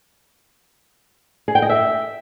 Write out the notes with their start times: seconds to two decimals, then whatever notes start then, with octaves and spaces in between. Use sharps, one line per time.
1.48 G#4
1.55 G5
1.62 D#5
1.69 E5